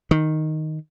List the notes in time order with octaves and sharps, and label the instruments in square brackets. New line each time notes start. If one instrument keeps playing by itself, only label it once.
[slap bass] D#3